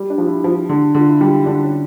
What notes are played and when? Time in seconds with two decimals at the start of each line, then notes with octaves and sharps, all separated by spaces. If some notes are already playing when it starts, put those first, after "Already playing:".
Already playing: G3
0.10 D4
0.18 F3
0.26 E4
0.44 F3
0.69 D3
0.95 D3 F4
1.08 E4
1.21 G3 F4
1.33 E4
1.46 D3 D4
1.63 C#4